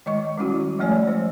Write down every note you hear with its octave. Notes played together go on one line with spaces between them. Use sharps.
D#3 G#3 D#5 C#6
D#3 G3 C#4 E4 F#4
F3 G#3 A3 C#5 D5 G#5
F3 C5